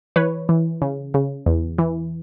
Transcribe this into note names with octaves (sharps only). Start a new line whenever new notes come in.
E3 B4 C#5
E3
C#3
C#3
E2
E3